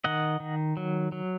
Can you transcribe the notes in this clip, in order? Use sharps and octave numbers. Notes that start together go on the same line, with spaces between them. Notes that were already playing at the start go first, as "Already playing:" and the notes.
D#3 D#5 F#5
D#3
F#3
F#3